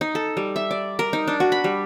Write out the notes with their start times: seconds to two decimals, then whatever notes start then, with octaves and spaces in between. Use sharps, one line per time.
0.01 D#4
0.15 A4
0.37 G3
0.56 E5
0.71 D5
0.99 A#4
1.13 D#4
1.28 D4
1.40 F#4
1.52 B5
1.64 G3